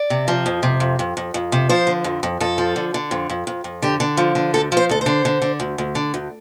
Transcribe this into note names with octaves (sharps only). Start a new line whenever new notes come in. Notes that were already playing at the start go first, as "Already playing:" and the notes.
Already playing: D5
C3
F3
F2
C3
F2
F2
F2
F2
C3
F3 C5
D3
F2
F2
F2 A4
F3
D3
D3
F2
F2
F2
F2
D3 G4
D3
F3
D3
D2 A4
F3
C5
D2 A4
C5
D3
D3
D3
D2
D2
D3
D2